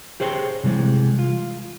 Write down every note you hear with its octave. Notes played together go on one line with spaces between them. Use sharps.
G4 G#4 C5 C#5 G5
C3 E3 G3 G#3
F4